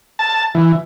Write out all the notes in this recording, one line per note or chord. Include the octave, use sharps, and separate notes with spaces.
A5
E3